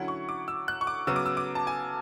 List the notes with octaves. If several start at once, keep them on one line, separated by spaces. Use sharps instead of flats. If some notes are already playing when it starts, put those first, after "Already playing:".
Already playing: D3 F#3 C#4 E4 F#5
C#6
D6
E6
F#6
C#6
D6
C#3 F#3 B3 E6
D6
E6
D6
A5
G#5